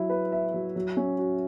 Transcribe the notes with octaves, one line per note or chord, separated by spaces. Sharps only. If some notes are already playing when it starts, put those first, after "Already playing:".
Already playing: F#3 E4
B4
E5
F#3
F#3
C#4
F#4